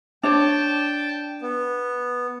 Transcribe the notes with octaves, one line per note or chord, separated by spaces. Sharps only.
D4 C#5 G5 A5
B3